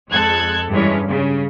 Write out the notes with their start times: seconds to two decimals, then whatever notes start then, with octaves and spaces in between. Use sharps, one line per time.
0.11 F2 G#3 A4 F#6 G#6
0.71 G2 E3 G#3 C#4
1.07 C#3